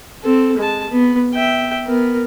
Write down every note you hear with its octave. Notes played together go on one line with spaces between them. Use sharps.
C4 A4
G#3 A5
B3
E5 G5
B3 A#4